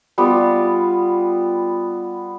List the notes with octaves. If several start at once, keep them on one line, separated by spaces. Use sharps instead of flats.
G3 B3 F4